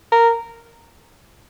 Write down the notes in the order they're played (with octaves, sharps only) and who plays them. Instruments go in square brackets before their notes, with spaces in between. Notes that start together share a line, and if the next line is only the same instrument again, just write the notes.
[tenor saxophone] A#4